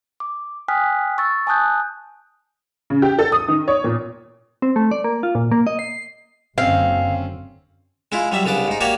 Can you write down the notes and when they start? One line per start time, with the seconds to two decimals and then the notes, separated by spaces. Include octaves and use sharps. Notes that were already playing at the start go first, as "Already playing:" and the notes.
0.20 D6
0.68 G5 G#5 D#6 F6 F#6 B6
1.18 C#6 E6 A6
1.47 G#5 A5 D#6 F#6 G6
2.90 C#3
3.02 G4
3.19 A4
3.32 D#6
3.48 D#3
3.68 C#5
3.84 A#2
4.62 C4
4.76 A3
4.91 D5
5.04 A#3
5.23 F4
5.35 A#2
5.51 A#3
5.67 D#5
5.79 C7
6.58 F#1 F#2 D3 C4 C#4 F5
8.12 G#3 E4 F4
8.32 F#3 G3 E5
8.45 C2 C#3 B3 D4 D6
8.68 G#2 D#4
8.81 A#3 F#4 G4 C#5 D5